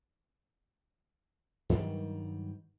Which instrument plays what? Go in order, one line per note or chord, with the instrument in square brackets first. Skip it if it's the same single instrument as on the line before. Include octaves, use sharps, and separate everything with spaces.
[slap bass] G2 D#3 F#3 G3